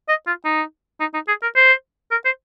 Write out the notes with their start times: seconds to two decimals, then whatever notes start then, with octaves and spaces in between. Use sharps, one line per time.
0.09 D#5
0.27 F4
0.45 D#4
1.00 D#4
1.14 D#4
1.28 G#4
1.42 A#4
1.56 C5
2.11 A#4
2.25 C5